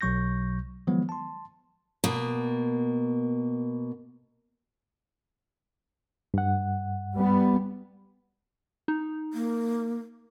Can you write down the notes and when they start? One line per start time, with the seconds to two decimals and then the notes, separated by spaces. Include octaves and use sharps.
0.01 B1 B2 F#3 C#6 G6 A#6
0.87 D#3 F3 F#3 G#3 B3
1.09 A5 C6
2.04 B2 A#3
6.34 G2 F#5
7.17 G3 B3
8.88 D#4
9.33 A#3